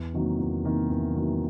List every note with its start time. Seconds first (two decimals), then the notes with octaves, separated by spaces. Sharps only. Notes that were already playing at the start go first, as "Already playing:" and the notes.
Already playing: E2
0.13 C3 D#3 F#3 A#3
0.39 E2
0.64 C3 D#3 F#3 A#3
0.89 E2
1.14 C3 D#3 F#3 A#3